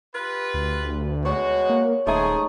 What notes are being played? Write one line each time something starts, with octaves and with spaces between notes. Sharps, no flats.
F4 G4 B4
D2
B2 G#3 F#4 C#5
A#3
D#1 F3 G#3 A3 D#4 G#4